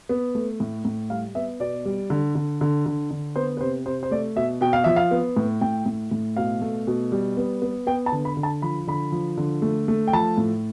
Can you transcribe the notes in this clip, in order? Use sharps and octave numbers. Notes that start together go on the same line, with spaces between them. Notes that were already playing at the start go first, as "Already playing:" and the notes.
B3
A3
A2
A2
G3 F5
B3 E5
B2 D5
G3
D3
D3
D3
D3
D3
B3 C5
B4
C3 C5
C3 C5
C5
A3 D5
B2 E5
B2 G5
F5
F3 E5
F5
B3
A2
A2 G5
A2
A2
B2 F5
A3
B2
G3
B3
B3
B3 G5
A5
D3
B5
D3
A5
F3 B5
D3 B5
F3
D3
A3
A3
G5
F3 A5
A2